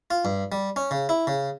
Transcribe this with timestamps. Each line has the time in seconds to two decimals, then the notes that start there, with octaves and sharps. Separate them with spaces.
0.10 F4
0.25 G2
0.52 G3
0.76 C#4
0.91 C#3
1.09 E4
1.27 C#3